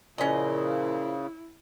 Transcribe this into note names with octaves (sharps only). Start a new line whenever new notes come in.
A#2 C#3 F3 C#4 E4 D#5